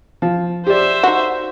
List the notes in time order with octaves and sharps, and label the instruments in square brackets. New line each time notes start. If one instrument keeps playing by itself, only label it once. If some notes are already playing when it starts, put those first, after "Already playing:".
[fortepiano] F3
[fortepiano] G4 D5 [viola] C5 E5
[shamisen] D#4 F#4